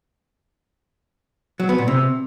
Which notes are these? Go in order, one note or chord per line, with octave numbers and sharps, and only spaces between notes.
F#3
B3
A#2
C3